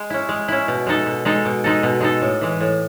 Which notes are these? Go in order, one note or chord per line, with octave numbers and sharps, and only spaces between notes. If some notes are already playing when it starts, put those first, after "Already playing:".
Already playing: G#3
C#4 E4
G#3
C#4 E4
B2
G#3 D#4 A4
B2
G#3 D#4 A4
B2
G#3 D#4 A4
B2
G#3 D#4 A4
A2
E3 G#3
A2